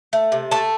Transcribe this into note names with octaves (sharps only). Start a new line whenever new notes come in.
A3
C3
A3 A5